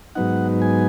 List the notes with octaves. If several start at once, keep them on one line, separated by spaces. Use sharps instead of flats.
G#2 F#3 B3 D#4 F#5
G#5